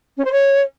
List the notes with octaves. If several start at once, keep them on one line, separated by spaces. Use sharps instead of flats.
C#4
C5
C#5